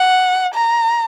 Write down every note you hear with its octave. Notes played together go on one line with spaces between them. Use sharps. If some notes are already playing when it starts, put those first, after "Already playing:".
Already playing: F#5
A#5